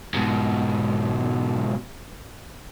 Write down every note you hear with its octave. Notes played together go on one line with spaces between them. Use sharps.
G#2 B2